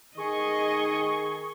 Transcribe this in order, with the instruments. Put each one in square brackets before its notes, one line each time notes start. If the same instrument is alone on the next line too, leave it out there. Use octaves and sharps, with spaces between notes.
[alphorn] D#3 [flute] G#4 [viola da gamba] D#5 [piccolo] C#6